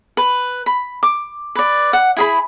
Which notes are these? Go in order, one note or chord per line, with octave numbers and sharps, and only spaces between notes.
B4
B5
D6
B4 D5
F#5
E4 G#4 B5